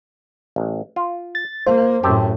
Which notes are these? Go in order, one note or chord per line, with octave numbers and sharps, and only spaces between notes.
A1
F4
A6
A#3 F4 C5
F#2 A2 C4 G4 A5